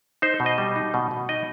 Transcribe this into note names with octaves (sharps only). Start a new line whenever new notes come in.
D#4 C5
B2
D#5
G3
D#4
B2
B2
D#4 D#5